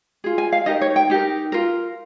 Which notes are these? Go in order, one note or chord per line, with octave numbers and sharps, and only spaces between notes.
F4 G#4
G#5
F5
D#4 G4 A#4 D#5
C#5
G5
D#4 G4 A#4
F4 A#4